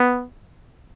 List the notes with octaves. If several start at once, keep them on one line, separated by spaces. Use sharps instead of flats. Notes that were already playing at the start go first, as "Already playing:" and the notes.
Already playing: B3